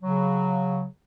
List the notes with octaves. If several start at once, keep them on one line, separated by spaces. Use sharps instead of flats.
C#3 F#3